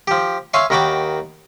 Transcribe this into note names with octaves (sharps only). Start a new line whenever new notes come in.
F3 G4
C#5 E5 F5 G#5 C6 C#6
D#2 D#3 F#4 G5 B5 D6